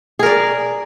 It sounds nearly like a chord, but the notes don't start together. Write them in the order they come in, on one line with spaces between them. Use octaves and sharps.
G#4 A#4 D5